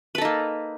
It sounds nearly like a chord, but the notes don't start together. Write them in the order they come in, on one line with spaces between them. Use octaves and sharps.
B4 A4 D#4 A#3